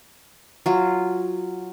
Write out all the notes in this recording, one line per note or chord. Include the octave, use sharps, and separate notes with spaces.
F#3 F4